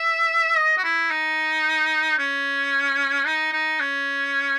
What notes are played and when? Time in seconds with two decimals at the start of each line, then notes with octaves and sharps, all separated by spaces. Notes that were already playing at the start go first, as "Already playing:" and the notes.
Already playing: E5
0.57 D#5
0.78 F#4
0.84 E4
1.10 D#4
2.18 C#4
3.26 D#4
3.53 D#4
3.80 C#4